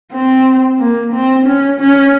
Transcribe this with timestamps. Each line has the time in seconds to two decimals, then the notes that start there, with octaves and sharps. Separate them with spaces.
0.13 C4
0.80 A#3
1.13 C4
1.46 C#4
1.80 C#4